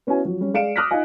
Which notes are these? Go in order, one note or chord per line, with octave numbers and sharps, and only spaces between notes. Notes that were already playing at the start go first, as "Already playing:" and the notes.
B3 C#4 E4 F#4 G#5
F3 F#3
G3 C#4
G#3 D5 F5 C#7 D7 E7
D6 D#6 F6 F#6 A#6 B6
D#4 F4 D#5 F5 G#5